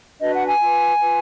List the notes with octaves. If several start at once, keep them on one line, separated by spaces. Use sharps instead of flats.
D4 F#4 B4 D#5
F#5
G#5
F4 B4
F4 B4